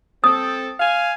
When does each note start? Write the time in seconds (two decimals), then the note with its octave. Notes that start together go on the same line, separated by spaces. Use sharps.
0.24 C4 A4 D#6
0.80 F5 G#5